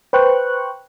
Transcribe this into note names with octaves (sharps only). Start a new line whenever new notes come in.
B4 C5 G5 C#6 F#6